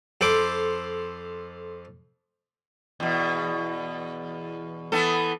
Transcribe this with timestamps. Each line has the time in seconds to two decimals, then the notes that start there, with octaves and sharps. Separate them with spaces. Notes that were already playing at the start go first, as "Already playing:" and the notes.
0.21 F2 A4 C5 B5 D6
3.00 E2 B2
4.92 E3 B3 A4